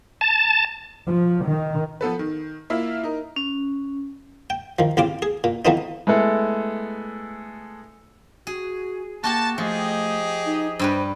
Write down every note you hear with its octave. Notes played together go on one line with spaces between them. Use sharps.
A5
F3
D#3
F3 B3 A4 B4
D#3
A#3 E4 F4 E5
D#4 A#4
C#4
G5
D#3 F3
A1 C#3 C4 F4 D6
G#4
A#2
E3 F3 A3 B3 C4 D#4
G#3 A3 B3 E4 A4
F#4 G#4
A#3 F#4 G4 F#5 A5
F3 A3 G4 G#4 D#5
D#4
G2 G3 B4 C5